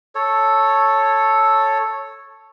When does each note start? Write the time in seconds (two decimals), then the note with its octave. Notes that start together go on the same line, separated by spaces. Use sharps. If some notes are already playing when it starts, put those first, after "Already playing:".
0.15 A4 C#5